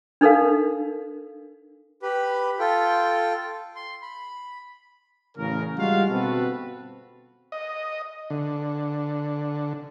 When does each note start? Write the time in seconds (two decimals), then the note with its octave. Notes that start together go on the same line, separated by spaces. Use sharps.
0.21 D4 D#4 A4 A#4 F5
2.02 G4 B4 B5
2.59 F4 A4 G5
3.76 C6
4.02 B5
5.38 A1 C#3 A#4
5.77 F#1 G3 G#3 F4 F#4 F5
6.10 G1 B2 C4 F#4 A4 B4
7.52 D#5
8.30 D3